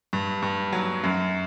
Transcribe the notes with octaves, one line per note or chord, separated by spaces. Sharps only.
G2
G2
F#3
F#2